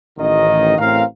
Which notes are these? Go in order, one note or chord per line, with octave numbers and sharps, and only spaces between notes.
A1 D#3 D#5
A1 A2 C4 A#4 F5